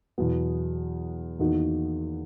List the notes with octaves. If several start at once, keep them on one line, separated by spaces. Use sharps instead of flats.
E2 B2 F#3 B3 E4
E2 D#3 A#3 D#4 F#4